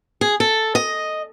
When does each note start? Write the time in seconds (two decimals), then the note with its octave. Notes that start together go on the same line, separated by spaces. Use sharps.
0.21 G#4
0.40 A4
0.75 D#5